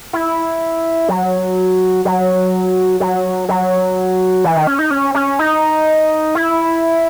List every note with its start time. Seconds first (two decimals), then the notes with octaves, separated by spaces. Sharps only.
0.13 E4
1.09 F#3
2.05 F#3
3.00 F#3
3.49 F#3
4.44 E3
4.56 D#3
4.67 C#4
4.79 D#4
4.91 C#4
5.15 C#4
5.39 D#4
6.35 E4